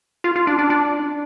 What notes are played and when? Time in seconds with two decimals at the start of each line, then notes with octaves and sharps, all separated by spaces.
0.24 F4
0.36 F4
0.47 D4
0.59 D4
0.70 D4